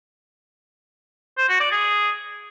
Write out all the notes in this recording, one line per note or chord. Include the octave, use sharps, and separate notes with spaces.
C5
F#4
D5
G#4